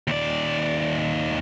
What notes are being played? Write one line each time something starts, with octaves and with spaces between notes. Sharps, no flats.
D#2 D5